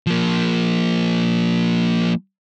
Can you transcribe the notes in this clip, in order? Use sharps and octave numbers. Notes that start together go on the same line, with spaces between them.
F3 A#3